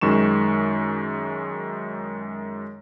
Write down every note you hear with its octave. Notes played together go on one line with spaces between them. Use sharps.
F#2 D#3 G#3 C#6 E7